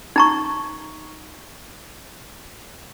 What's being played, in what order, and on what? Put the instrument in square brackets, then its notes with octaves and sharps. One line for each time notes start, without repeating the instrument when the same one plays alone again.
[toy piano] D#4 A#5 C#6